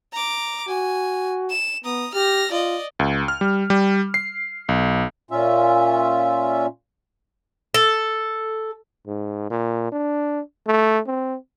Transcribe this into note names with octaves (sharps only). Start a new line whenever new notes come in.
A#5 D6
F#4 G#5
E7
B3 A#5 D#6
G4 F6 A#6
F4 D5 D#5
C#2
F6
G3
G3
C7
B1
A#2 C#4 F4 E5
A4
G#2
A#2
D4
A3
C4